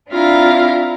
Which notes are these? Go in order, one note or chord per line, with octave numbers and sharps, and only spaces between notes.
C4 D4 E4 F4 F5 A#5